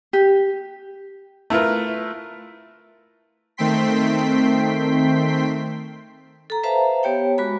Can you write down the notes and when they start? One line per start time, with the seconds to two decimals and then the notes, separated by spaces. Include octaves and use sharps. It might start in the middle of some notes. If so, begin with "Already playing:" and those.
0.13 G4
1.50 A3 E4 F4 A#4 B4
3.57 D#3 A3 C4 G5 C6 B6
6.50 A4 A#5
6.63 B4 C5 E5 F5 A5 A#5
7.03 B3 G4 C#5 G5
7.38 G#3 F#4 B5